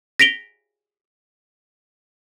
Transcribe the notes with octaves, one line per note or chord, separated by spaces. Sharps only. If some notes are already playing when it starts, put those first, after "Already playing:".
A#6 B6 D7 F7 G7